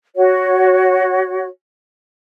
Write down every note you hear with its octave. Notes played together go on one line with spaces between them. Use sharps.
F#4 C#5